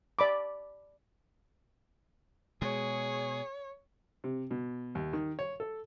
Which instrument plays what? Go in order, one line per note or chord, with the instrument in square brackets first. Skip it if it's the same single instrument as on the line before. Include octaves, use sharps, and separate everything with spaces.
[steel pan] D5 B5 D6
[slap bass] B2 G#3 [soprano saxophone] G#4 [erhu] C#5
[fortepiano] C3
B2
D#2
D#3
C#5
A4